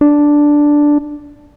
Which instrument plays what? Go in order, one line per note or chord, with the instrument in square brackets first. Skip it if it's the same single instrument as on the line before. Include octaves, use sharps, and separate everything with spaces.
[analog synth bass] D4